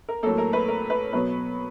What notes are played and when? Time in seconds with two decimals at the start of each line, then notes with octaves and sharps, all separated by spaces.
0.09 A#4
0.23 A2 F#3 A#3 A4
0.38 A#4
0.53 B4
0.68 A#4
0.90 B4
1.12 B2 F#3 B3 B4